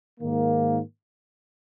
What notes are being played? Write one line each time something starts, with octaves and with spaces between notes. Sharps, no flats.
G#2 D#3 A#3